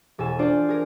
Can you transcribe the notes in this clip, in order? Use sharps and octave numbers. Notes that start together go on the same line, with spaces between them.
E1 A4 G#5 E7
D4 F4 C5 D5
G#4 A#4